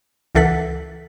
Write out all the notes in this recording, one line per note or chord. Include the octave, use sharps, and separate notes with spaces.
C#2 E3 A4 F#5 B6